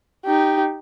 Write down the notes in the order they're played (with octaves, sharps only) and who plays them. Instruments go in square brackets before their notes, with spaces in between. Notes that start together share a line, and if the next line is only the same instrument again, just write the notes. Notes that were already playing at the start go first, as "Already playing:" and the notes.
[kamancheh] D#4 G4